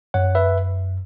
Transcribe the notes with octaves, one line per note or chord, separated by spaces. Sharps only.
F#2 C#5 F#5
B4 E5